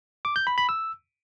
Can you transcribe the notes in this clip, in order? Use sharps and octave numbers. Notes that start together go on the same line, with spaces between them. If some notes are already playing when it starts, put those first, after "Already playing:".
D6
G6
B5
B5
E6